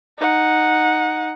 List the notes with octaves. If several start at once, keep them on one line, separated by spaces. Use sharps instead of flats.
D#4 F#5